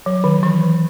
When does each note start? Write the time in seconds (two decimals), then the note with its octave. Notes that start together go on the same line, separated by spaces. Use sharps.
0.06 F#3
0.24 D#3
0.43 E3